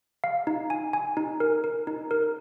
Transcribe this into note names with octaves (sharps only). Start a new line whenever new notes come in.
F5
D#4
G#5
G#5
D#4
A#4
A#4
D#4
A#4